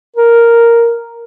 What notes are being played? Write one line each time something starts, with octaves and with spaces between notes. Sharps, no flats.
A#4